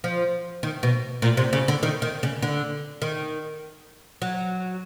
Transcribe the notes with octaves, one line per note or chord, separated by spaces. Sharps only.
F3
D#3
B2
A#2
C3
C#3
D3
D#3
D#3
C#3
D3
D#3
F#3